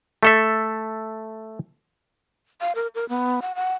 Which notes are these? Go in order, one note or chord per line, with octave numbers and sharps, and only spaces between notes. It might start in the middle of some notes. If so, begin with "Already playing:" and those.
A3 A4 E5
F5
A#4
A#4
B3
F#5
F#5